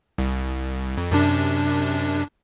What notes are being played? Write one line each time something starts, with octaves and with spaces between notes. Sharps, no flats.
C2
F2
F#2 C3 D4